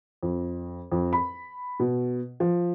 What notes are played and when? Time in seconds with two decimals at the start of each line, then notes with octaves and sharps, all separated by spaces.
0.23 F2
0.92 F2
1.13 B5
1.80 B2
2.40 F3